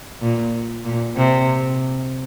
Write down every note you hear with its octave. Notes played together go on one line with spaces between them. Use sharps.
A#2
A#2
C3